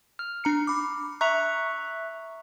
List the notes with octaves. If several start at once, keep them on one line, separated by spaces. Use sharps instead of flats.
F6
D4 A#5 C#7
B5 D6
E5 A#5 C#6 F#6 F7